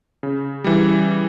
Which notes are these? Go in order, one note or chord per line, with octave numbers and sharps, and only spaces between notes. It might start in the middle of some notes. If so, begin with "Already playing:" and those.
C#3
E3 G3